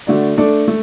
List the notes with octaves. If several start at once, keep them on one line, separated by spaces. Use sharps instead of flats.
D3 A3 F#4 D5
A3 D4 A4 D5
A3